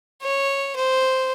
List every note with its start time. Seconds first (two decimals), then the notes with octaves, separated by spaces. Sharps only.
0.22 C#5
0.76 C5